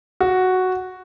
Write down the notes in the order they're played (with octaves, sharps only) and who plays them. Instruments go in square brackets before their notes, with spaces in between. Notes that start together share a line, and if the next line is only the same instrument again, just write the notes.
[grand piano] F#4